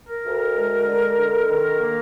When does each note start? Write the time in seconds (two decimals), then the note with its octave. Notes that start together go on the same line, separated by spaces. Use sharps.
0.09 A#4
0.25 D2
0.56 G#3
0.87 D3
1.17 D3
1.48 D#3
1.80 A#3